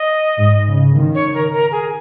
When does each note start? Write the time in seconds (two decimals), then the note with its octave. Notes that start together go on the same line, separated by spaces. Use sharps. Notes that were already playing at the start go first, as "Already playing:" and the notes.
Already playing: D#5
0.39 G#2
0.68 C#3
0.96 D#3
1.15 C#5
1.34 A#4
1.53 A#4
1.72 G#4